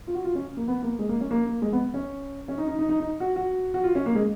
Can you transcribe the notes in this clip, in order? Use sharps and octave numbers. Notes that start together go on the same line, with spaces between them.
F4
F#4
F4
C#4
A#3
B3
A#3
G#3
A#3
C#4
A#3
A#3
G#3
B3
C#4
C#4
D#4
D#4
D#4
D#4
D#4
F#4
F#4
F#4
F4
C#4
A#3
G#3